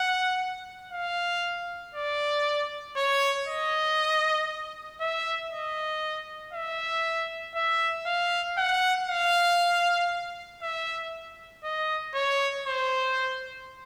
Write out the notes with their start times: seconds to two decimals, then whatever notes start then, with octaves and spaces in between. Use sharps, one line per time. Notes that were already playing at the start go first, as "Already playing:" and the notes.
Already playing: F#5
0.92 F5
1.95 D5
2.97 C#5
3.47 D#5
5.01 E5
5.51 D#5
6.53 E5
7.55 E5
8.06 F5
8.58 F#5
9.08 F5
10.62 E5
11.64 D#5
12.14 C#5
12.67 C5